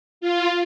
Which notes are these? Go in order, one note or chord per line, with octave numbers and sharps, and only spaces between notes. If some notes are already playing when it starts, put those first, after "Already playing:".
F4